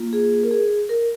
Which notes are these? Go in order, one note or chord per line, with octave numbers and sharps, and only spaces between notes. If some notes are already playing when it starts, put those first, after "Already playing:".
Already playing: A#3 F4
G#4
A#4
G#4
A#4